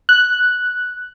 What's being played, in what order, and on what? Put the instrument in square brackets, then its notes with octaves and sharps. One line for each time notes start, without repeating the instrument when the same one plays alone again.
[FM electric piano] F#6